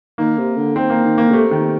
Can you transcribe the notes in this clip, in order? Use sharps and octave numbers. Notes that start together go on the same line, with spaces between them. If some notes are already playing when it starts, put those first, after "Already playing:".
D#3 A#3
C3
D3
D#3 C4
A#3
D#3
A#3
D3
C3 A3
D#3